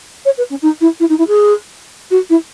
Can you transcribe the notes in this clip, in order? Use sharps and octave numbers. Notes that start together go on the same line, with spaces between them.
C#5
B4
C#4
D#4
E4
E4
D#4
E4
G#4
F#4
E4